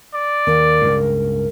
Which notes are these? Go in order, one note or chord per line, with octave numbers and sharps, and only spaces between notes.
D5
D#2 A#4
C#2 G2 C#3